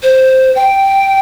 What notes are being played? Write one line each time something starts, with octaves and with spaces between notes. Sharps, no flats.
C5
G5